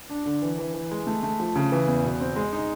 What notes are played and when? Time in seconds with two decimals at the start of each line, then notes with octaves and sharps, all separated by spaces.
0.10 D4
0.26 D3
0.42 E3
0.59 E3
0.74 E3
0.91 G#3
1.07 A3
1.23 A3
1.40 F3
1.56 C#3
1.72 E3
1.88 E2
2.04 B2
2.20 C4
2.36 G#3
2.53 D#4